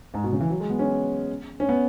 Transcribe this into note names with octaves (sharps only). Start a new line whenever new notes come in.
G#2
B2
C#3
E3
F#3
G#3
B3
C#4
C#4
B3